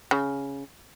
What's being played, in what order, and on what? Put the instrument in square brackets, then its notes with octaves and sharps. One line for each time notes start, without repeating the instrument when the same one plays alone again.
[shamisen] C#3